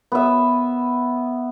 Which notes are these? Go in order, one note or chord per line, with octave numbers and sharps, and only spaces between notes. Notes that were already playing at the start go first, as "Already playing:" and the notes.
B3 E5